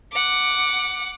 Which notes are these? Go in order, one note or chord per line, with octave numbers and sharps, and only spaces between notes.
F#5 D6